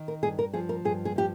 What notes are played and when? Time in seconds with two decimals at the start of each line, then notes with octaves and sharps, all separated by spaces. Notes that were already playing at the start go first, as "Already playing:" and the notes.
Already playing: D#3
0.08 A#4
0.23 G2 G#4
0.39 A#4
0.53 F3 G#4
0.69 A#4
0.85 G2 G#4
1.05 G#4
1.16 F3 G4